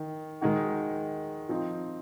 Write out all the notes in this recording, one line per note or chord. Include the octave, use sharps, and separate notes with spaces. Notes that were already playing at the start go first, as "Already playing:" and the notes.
Already playing: D#3
D#3 G#3 D#4 F#4
F3 C4 D#4